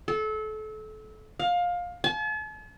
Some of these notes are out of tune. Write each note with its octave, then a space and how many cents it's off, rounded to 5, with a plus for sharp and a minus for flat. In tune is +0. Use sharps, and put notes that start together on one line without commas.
A4 -30
F5 +20
A5 -45